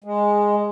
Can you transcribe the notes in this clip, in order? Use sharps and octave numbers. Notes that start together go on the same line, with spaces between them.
G#3